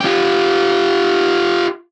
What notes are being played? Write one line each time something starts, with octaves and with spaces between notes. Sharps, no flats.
F4 G4